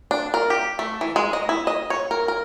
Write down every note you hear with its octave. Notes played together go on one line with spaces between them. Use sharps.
D4
A#4
G4
A3
E3
G#3
D#5
E4
D#5
C#5
A#4
A#4